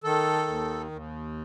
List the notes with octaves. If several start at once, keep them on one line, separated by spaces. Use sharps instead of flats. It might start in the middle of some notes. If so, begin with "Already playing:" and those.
D#3 A4
D#2
D#2